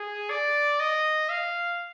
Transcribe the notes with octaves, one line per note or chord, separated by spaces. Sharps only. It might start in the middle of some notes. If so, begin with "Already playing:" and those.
Already playing: G#4
D5
D#5
F5